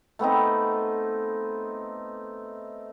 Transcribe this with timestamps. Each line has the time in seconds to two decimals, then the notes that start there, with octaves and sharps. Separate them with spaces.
0.19 A3 B3 C4 D#4